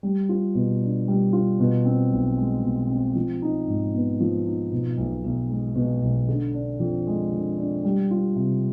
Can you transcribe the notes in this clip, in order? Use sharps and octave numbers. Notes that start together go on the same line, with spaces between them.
G3
F4
B2
D4
G3
F4
B2
C4
B1
G#3
B2
C4
F3
D#4
G#2
B3
F3
D#4
B2
B1
B1
G#3
B2
B1
D3
D4
F2
G#3
D3
D4
G3
F4
C3